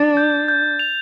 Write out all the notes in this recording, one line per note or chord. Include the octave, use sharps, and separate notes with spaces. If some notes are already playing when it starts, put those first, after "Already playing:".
Already playing: D4 A6
G6
G6
F7